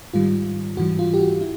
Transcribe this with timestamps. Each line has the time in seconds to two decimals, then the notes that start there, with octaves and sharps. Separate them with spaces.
0.14 G#2 D#3 G3 F4
0.77 G#2 E3 G3 F#4
0.99 F4
1.14 G4
1.21 F#4
1.41 E4